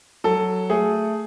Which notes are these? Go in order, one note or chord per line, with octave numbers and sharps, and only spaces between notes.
F#3 A4
A3 G#4